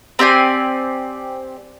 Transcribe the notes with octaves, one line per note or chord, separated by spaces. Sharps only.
C4 G4 D5 G#5